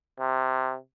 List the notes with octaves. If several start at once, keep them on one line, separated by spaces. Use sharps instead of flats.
C3